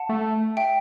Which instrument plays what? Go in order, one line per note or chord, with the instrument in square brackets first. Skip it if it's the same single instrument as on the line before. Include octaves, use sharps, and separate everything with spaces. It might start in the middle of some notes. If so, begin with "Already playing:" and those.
Already playing: [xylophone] F#5 A5
[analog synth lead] A3
[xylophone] E5 G5